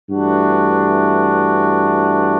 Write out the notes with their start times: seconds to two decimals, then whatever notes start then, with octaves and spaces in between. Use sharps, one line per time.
0.10 G2 E3 A3 D4 F#4